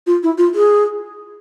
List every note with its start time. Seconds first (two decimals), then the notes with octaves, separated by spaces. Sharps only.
0.07 F4
0.23 E4
0.38 F4
0.54 G#4